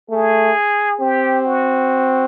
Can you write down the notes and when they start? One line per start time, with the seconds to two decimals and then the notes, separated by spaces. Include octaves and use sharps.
0.10 A3 G#4
1.01 C4 G4
1.46 F#4